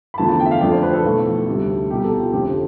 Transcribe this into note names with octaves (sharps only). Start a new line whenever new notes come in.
B5
E2 D3 F3 A3 A5
A5
G5
E5
F5
F2 D3 F3 A3 D5
C5
B4
A4
B1 A2 F3
D2 C3 G3
C2 B2 G3 G4
G4
A4
F4
F1 F2 D3 A3 G4